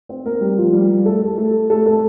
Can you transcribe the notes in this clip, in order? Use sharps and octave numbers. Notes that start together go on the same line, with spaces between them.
C4 C5
A#3 A#4
G3 G4
F3 F4
G3 G4
A3 A4
A3 A4
A3 A4
A3 A4
A3 A4